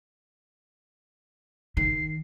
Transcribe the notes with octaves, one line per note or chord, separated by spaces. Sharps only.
D#3 C7